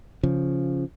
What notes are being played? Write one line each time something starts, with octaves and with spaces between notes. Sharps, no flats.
C#3 F3